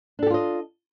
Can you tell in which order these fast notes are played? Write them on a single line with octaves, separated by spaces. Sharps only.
D4 A4 G4 F4 D#5